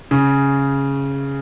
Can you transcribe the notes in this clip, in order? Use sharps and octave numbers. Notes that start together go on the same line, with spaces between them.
C#3